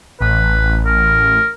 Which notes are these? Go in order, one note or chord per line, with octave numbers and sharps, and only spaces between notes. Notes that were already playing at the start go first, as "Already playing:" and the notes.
A1 B4
A#4